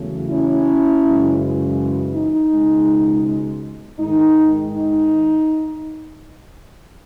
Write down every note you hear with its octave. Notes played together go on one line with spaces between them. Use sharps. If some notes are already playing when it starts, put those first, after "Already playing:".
Already playing: E2 C#3 F#3 A3
C#4 E4
F#2 C#3 E3 G#3
D#4
C#2 B2 G#3
G#2 D#3 G#3 D#4
D#4